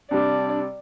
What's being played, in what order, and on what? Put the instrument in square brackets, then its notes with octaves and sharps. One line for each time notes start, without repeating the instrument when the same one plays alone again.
[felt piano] C3 G3 [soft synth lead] D4 [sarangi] D5